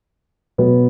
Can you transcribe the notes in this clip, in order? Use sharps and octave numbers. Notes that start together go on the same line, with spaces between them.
B2 F#3 B3